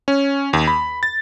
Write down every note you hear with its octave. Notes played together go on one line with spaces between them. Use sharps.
C#4
D#2
B5
A6